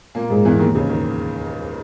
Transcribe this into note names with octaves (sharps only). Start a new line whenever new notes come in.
A#2 A#3
G#2 G#3
E2 E3
D#2 D#3
C#2 C#3
D#3